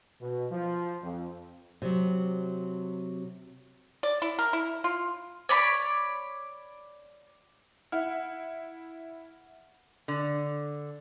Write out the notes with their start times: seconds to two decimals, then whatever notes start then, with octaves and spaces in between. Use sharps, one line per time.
0.20 B2
0.50 F3
1.02 F2
1.82 C3 F#3
4.03 D5
4.22 E4
4.39 A#4
4.53 E4
4.84 F4
5.49 C#5 D5 B5
7.92 E4 F#5 F6
10.08 D3